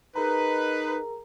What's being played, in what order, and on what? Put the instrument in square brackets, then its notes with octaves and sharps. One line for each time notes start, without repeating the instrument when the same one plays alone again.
[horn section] D#4 B4 [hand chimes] G#4 A#4 A#5